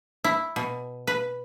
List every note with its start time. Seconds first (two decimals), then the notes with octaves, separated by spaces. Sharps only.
0.24 E4
0.56 B2
1.07 B4